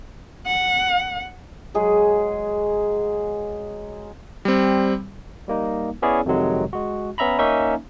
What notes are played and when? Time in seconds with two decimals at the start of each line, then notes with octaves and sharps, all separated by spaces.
0.46 F#5
1.74 F#3 G#3 G#4
4.45 G3 C4
5.48 G3 A#3 D#4
6.02 B3 C#4 E4 G#4 C#5 D5
6.26 F2 C3 D#3 F#3 G#3
6.73 G#3 F#4
7.18 B3 C#4 E5 A#5 B5
7.39 A#3 C#4 D#4 E5